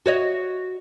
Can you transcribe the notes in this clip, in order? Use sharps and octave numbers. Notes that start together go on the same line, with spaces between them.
F#4 C#5 D#5